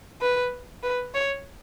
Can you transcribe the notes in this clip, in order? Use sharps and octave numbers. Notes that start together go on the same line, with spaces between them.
B4
B4
C#5